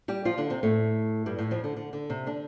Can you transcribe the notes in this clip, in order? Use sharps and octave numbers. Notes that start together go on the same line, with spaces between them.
G3 G4
F3 F4
D3 D4
C3 C4
A2 A3
G2 G3
A2 A3
F2 F3
D3
D3
D3
C3
D3 D4